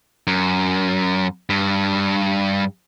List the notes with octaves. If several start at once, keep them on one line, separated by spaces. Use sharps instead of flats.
F#2
G2